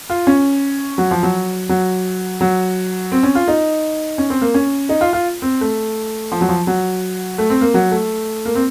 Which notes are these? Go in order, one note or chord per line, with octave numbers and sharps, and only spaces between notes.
F4
C#4
F#3
F3
F#3
F#3
F#3
C4
C#4
F4
D#4
C#4
C4
A#3
C#4
D#4
F4
F4
C4
A3
F3
F#3
F3
F#3
A3
C4
A#3
F#3
A3
A#3
C4